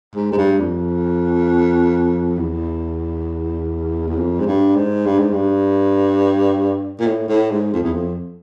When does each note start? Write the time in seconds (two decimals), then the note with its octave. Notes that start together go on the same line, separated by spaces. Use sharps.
0.15 G#2
0.32 G#2
0.37 G2
0.60 F2
2.38 E2
4.08 E2
4.17 F2
4.40 G#2
4.46 G2
4.76 G#2
5.06 G2
5.19 G#2
5.33 G2
7.00 A#2
7.07 A2
7.29 A2
7.51 G#2
7.73 F2
7.84 E2
7.94 F2